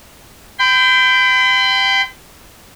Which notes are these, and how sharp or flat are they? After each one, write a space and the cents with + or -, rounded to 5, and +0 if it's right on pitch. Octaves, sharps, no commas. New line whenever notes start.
G5 +0 B5 +45